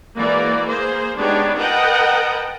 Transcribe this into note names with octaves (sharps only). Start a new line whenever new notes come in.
E3 G#3 A#3 F#4 D5
A#3 G#4 C5
G#3 B3 D4 D#4 G4 C#5
A#4 B4 D#5 F#5 G5 A5